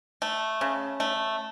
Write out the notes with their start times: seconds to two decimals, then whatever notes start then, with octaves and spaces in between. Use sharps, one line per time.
0.22 A3
0.61 C#3
1.00 A3